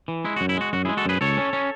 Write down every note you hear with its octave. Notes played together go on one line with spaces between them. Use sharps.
E3
G#3 E4
F#4
F#2
E4
G#3 F#4
F#2 F#4
G#3 E4 G#4
F#4 A4
F#2 G#4 B4
C#2 A4 C#5
C#4
C#4